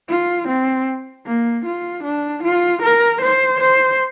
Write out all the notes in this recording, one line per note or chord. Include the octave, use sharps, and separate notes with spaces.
F4
C4
A#3
F4
D4
F4
A#4
C5
C5